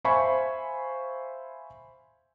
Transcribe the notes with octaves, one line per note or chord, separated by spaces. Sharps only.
C5 E5 F5 G#5 B5 C#6